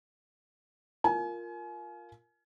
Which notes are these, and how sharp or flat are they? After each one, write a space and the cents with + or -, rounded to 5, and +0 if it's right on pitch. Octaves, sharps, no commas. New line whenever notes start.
F4 +0 A#4 -5 G#5 +35